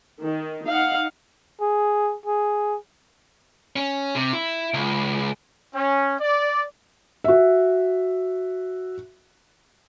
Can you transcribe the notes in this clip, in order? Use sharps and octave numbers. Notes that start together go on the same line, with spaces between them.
D#3
D#4 F5 F#5
G#4
G#4
C#4
C3
E4
C#2
C#4
D5
F#4 E5